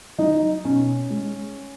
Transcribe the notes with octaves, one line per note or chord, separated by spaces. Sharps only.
F#3 D#4
B2 C#4
G#3